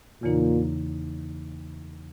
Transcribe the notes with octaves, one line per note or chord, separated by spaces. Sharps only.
E2 A#2 C#3 E3 A#3 D#4